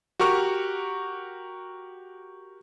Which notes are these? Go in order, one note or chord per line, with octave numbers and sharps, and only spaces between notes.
F#4 G4 A#4 C#6 F6